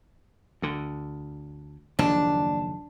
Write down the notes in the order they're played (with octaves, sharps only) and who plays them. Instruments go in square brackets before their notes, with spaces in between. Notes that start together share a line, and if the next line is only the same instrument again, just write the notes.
[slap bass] D2 D3
[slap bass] F#1 D#2 F3 [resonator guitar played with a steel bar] D4